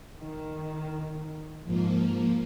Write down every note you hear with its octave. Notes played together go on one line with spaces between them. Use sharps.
D#3
G#2 F3 A#3